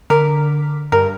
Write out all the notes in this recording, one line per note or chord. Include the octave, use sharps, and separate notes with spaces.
D3 A#4 D6 B6
G2 A#4